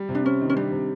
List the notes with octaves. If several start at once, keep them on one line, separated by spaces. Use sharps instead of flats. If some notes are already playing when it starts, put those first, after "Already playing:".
Already playing: G3
C3
D4
C4 C#4
D#3
C#4
G3 D4
C3